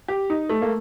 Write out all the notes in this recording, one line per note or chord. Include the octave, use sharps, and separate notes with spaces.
G4
D#4
A3
A#3